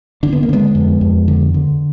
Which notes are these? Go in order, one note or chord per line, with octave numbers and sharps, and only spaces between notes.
D3 D4
B3
A#3
D3 G#3 B3
F2
F2
D3
D3